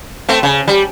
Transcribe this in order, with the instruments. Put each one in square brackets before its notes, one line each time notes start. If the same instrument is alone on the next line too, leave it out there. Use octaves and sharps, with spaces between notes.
[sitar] A3 C4
C#3
G3